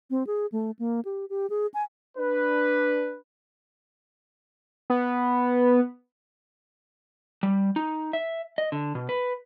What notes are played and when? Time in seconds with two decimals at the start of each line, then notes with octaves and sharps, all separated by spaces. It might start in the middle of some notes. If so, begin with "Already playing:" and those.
0.10 C4
0.27 G#4
0.52 A3
0.79 A#3
1.05 G4
1.30 G4
1.50 G#4
1.74 G#5
2.18 D4 B4
4.90 B3
7.43 G3
7.76 D#4
8.13 E5
8.58 D#5
8.72 D3
8.95 B2
9.09 B4